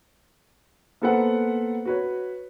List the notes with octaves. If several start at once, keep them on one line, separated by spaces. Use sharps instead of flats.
A#3 B3 A4 B4 C5 F#5
F#4 B4 C#5